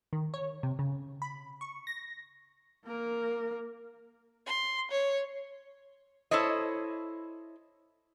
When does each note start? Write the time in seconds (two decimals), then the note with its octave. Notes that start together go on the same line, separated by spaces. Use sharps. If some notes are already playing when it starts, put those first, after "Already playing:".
0.13 D#3
0.34 C#5
0.63 C3
0.79 C#3
1.22 B5
1.61 C#6
1.87 A#6
2.85 A#3 A#4
4.46 C6
4.91 C#5
6.31 E4 A4 C5 C#5 D#5